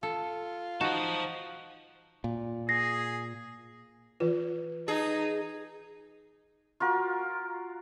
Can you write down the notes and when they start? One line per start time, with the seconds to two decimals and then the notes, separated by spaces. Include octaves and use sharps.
0.03 F4 A4
0.81 D#4 F#4 C5 A5
2.24 A#2
2.69 G#4 A#6 C7
4.20 E3 F4 B4
4.88 D#4 G#4
6.80 F4 F#4 A#4